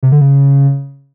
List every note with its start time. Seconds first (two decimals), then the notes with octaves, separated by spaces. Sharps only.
0.03 C3
0.12 D3
0.21 C#3